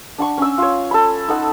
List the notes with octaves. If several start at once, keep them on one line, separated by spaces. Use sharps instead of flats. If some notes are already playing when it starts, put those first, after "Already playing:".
D4 F#5 C#6
C#4 E6
F4 C#5
A4 B5
D#4 A4 F#5 E6